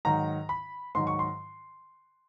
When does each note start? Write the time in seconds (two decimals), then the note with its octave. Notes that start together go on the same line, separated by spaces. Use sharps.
0.05 G#2 D#3 F#3 A#5
0.49 B5
0.95 G#2 D#3 F#3 C6
1.07 C#6
1.19 C6